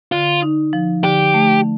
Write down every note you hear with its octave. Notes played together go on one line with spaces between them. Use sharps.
D3 F4
D#4
F3
D3 G4
A3